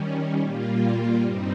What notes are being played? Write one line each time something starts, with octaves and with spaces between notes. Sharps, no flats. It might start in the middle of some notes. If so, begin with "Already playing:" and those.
Already playing: D#3 G3 C#4
A#2 G3 A#3 F4
G2 G3 C4 D#4